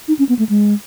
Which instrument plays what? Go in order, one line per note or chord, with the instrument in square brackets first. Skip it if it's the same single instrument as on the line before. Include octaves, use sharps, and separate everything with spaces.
[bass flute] D#4
C#4
B3
A3
G#3